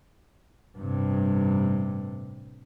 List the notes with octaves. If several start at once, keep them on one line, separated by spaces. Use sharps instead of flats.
A1 G2 C3